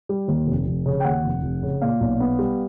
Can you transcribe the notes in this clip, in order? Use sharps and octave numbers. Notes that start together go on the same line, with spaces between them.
G3
D#2
F1
F1
C#3
G5
D#2 F#5
F1
F1
C#3
A#2 F5
B1
B3
G3